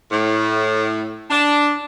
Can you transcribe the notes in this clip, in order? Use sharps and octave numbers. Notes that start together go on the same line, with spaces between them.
A2
D4